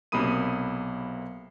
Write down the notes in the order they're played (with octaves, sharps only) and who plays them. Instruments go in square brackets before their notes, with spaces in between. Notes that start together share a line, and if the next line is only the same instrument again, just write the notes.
[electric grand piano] B1 C3 A#3 B5 D#6 D#7